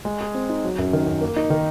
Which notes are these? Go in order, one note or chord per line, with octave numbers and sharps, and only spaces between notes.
G#3
G#4
C4
D#4
F#3
F#2
D#3
F#2
A#3
D#4
D#3